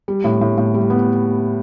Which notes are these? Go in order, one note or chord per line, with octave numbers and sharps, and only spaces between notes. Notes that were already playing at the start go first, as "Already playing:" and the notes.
G3
A2
A2
A2
G3
B3